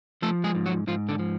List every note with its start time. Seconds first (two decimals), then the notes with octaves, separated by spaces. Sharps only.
0.22 F3 A3 A4
0.44 G#3 G#4
0.55 G#2
0.66 F#3 F#4
0.87 G#2 F3 F4
1.09 D3 D4
1.19 F3